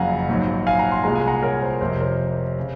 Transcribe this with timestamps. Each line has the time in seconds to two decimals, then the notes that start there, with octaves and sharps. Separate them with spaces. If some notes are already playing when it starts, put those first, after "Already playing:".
Already playing: F#1 F2 C#3 F#3 F5 F#5 G#5 A#5
0.28 A#1 G#2 F#3
0.67 F5 G#5
0.79 F#5 A#5
0.92 C6
1.03 C2 A#2 G#3 A#5
1.15 G#5
1.27 F#5 A#5
1.43 A#4 C#5
1.62 C5
1.81 F1 F2 C3 C5
2.00 A#4 C#5
2.60 C#3